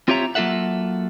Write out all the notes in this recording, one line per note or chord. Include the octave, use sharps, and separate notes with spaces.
C4 F4 G4 C#5 E5 A#5
F#3 A#3 F4 A4 E5 F#5